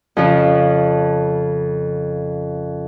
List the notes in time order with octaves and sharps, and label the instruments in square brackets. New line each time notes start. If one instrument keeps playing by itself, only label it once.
[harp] F2 C#3 F3